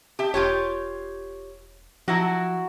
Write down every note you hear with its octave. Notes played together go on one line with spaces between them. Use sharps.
G4 E5
E1 F4 G4 C#5
F3 F#3 E4 F#4